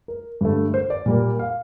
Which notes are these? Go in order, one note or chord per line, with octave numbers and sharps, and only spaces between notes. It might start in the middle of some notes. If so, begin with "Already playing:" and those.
A#4
G2 D3 A3
C5
D5
A#2 G3 A#3
F5